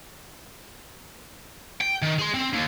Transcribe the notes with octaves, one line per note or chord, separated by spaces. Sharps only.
G5
D#3
G#4 C6
C4
D#2